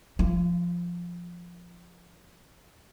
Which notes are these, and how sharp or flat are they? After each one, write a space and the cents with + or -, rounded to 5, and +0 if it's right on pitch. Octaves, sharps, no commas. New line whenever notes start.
F3 +0 F4 -35